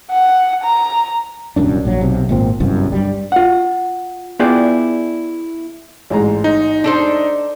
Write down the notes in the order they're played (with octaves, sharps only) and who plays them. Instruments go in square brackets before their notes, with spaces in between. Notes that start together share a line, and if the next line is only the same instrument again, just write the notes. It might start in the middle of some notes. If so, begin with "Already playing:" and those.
[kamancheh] F#5
A#5
[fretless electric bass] D#1 C2 F#2 D4
A#1 F#3
B1 C3
G#1 A#2 C4
G1 C2 F#2
G2 G3
[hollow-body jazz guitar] F4 F#5
B3 E4 F4 G#4 D5 G5
[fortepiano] A1 G#2 A#5
[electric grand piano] D#4
[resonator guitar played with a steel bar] D4 A4 C5